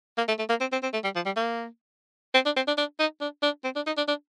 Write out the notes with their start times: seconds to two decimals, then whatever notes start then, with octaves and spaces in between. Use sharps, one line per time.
0.18 A#3
0.28 A3
0.39 A3
0.49 A#3
0.61 C4
0.72 C4
0.83 C4
0.93 A3
1.04 G3
1.16 F3
1.26 G3
1.37 A#3
2.34 C4
2.46 D4
2.56 C4
2.67 D4
2.78 D4
2.99 D#4
3.21 D4
3.43 D4
3.64 C4
3.76 D4
3.86 D#4
3.97 D4
4.08 D4